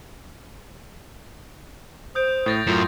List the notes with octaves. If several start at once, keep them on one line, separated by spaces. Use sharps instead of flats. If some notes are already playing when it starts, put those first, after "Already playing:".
C5 D#6 G6 D7
A2 D#6 A6 A#6
F#2 A2 F4